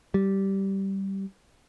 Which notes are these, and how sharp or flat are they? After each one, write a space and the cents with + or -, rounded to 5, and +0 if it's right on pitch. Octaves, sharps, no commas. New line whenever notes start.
G3 -10